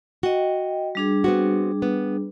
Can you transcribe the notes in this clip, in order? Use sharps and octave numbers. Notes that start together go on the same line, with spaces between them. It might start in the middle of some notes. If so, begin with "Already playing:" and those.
F#4 D#5 G5
G3 D4 G#4
B3 C4 F#4
B3